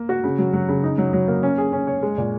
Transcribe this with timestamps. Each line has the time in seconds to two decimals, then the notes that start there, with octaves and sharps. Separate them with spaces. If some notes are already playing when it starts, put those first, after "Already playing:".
Already playing: A#3
0.09 F#4
0.24 C#3
0.38 F#3
0.53 F#3
0.68 C#3
0.83 D#4
0.98 F#3
1.13 F#3
1.28 A#3
1.43 C#4
1.58 G#4
1.73 C#4
1.87 C#5
2.03 G#3
2.18 A#2